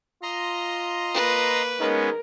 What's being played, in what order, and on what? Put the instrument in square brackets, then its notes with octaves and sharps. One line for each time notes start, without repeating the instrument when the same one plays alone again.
[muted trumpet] F4 [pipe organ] D#5 A#5 C6
[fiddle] A#3 B4
[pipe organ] G#3 B3 C#4 [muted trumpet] D#4 [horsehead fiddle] A#4